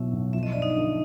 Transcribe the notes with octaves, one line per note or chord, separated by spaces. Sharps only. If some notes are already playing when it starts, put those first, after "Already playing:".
Already playing: B1 B2 F#3 E4 E5
B1
F3 E5
D#5
G2 D5
D#4 D#5
D3